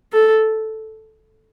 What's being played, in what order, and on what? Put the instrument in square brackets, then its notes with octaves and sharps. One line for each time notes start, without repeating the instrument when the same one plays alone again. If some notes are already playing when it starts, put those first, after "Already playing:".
[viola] A4